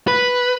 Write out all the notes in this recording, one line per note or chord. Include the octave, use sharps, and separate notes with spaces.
B4